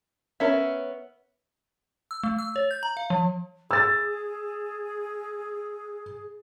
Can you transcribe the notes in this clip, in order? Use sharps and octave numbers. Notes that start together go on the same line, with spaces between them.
B3 C#4 A#4 E5
E6
A3
E6
C#5
G6
A#5
F5
F3
G#4 E6 A6